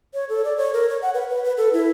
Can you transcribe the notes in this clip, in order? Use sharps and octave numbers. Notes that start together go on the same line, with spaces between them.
C#5
A4
D5
C#5
A#4
C#5
F#5
B4
B4
B4
A4
E4